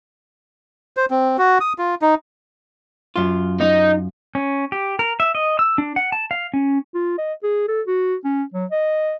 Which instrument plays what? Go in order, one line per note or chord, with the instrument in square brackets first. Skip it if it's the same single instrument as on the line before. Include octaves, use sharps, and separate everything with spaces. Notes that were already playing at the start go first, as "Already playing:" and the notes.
[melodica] C5
C4
F#4
D#6
F4
D#4
[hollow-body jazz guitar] F#2 F4
[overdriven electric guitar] D#4
[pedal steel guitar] C#4
G4
A#4
E5
D#5
E6
D4
F#5
A5
F5
C#4
[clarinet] F4
D#5
G#4
A4
F#4
C#4
F#3
D#5